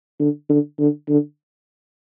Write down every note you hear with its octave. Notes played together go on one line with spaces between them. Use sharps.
D3
D3
D3
D3